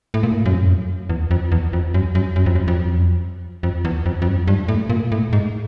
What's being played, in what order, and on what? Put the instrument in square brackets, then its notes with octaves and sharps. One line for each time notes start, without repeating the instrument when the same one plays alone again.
[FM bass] A2
A#2
A2
F#2
F2
F#2
E2
F2
E2
F2
F#2
F#2
F#2
F2
F#2
F2
F2
E2
F2
F2
F#2
G2
A2
A#2
A2
G#2